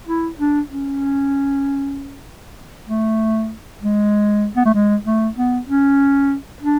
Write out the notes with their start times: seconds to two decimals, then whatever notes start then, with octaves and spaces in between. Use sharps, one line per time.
0.07 E4
0.39 D4
0.69 C#4
2.87 A3
3.81 G#3
4.56 B3
4.65 A3
4.74 G#3
5.07 A3
5.37 B3
5.69 C#4
6.62 D4